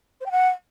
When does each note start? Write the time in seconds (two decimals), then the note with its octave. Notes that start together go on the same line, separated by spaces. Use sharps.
0.21 C5
0.26 G5
0.31 F#5